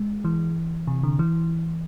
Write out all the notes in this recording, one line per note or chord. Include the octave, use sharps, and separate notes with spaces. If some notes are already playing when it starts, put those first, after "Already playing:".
Already playing: G#3
E3
C3
D3
E3